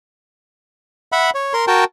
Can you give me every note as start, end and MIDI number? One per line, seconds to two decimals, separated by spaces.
1.12 1.30 76
1.12 1.30 78
1.12 1.30 83
1.35 1.53 73
1.53 1.65 70
1.53 1.65 84
1.68 1.84 66
1.68 1.84 70
1.68 1.84 79
1.68 1.84 81